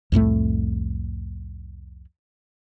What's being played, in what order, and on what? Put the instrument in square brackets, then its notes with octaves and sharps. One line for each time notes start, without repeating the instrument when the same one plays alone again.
[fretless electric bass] C2 F2 A2 A3